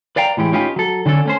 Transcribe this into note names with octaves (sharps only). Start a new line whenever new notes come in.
B4 D5 F5 G5 A#5
A2 E3 G#3 G4
C#4 D#4 F4 G4 B4
F#3 A4
D3 C#4 D4 A4
A3 C#4 C5